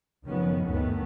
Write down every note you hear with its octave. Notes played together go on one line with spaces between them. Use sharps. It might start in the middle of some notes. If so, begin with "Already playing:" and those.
F#1 D#3 F3 G#3 B3 C#4
G1 D2 D#3 A3 B3